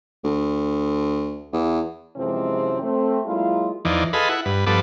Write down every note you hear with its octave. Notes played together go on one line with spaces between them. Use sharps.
D2
E2
F#2 C3 E3 F3 G#3 C4
A3 C4
F#3 G#3 A#3 E4 F4
E2 E3 F3 D#4 D5
F4 G#4 A4 B4 D#5 B5
E4 F#5
G2 B4
G2 F3 B3 A4 B4 D6